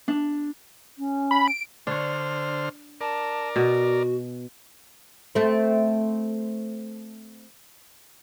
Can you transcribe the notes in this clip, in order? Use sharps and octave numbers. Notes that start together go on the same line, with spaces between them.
D4
C#4
B5
D7
D3 D4 C5 C#5 F6
A#4 D5 A5
B2 F#4
A3 C4